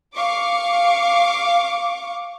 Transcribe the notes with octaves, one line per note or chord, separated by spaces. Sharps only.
F5 C#6 D6